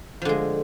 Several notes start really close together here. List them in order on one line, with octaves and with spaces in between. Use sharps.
F3 D3 G#3